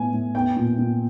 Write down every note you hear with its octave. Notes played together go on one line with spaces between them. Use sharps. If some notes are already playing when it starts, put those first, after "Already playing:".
Already playing: A2 B3 G#5
A2
B3 G5
A#2
A#2